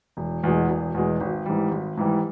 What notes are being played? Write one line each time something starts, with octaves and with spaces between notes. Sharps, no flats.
E1
E2 B2 G#3
E1
E2 B2 G#3
G#1
G#2 E3 G3
G#1
G#2 E3 G3